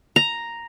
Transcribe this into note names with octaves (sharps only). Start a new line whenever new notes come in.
A#5